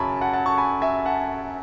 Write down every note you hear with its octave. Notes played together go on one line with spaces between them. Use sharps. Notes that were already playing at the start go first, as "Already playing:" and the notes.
Already playing: F#2 C#3 F#3 C#4 G#5 A5 B5 C#6
F#5 A5
F#5 A5
A5 C#6
G#5 B5
E5 G#5
F#5 A5